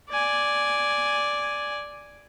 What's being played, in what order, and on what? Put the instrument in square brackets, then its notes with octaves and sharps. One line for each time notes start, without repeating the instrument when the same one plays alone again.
[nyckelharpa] D5 G#5